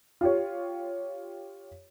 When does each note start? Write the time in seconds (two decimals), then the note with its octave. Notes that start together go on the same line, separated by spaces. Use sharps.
0.21 F4 G4 C#5